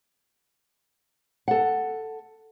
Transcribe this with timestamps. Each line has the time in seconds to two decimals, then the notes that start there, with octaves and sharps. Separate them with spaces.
1.48 A4 F#5